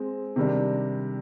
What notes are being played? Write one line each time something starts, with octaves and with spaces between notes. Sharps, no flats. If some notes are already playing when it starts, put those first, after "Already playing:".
Already playing: G#3 C4
C3 D#3 G3 D4